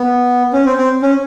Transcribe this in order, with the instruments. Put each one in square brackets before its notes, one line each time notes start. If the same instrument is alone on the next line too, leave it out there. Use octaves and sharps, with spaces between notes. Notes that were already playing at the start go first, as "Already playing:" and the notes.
Already playing: [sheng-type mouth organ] B3
C#4
C4
C4
C#4